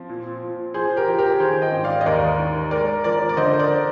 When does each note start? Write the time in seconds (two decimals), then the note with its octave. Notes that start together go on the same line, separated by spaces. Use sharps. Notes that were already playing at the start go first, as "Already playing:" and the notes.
Already playing: F3 C4
0.09 A#2
0.42 A#2
0.74 F3 G#4 C5
0.97 G4 A#4
1.07 F3
1.18 G4 A#4
1.40 D#3 G#4 C5
1.62 D#5 G5
1.73 G#2
1.84 D5 F5
2.01 D#5
2.06 D#2 A#4 D5
2.39 D#3
2.71 G#3 A#4 D5
3.04 F3 A#4 D5
3.29 D5
3.37 D3 C5 D#5
3.53 C5
3.59 A#4 D5